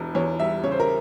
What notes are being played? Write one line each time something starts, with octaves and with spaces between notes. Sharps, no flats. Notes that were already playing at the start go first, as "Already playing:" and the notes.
Already playing: E1 E2
E2 C#5
G3 E5
C#3 C#5
C5
A#4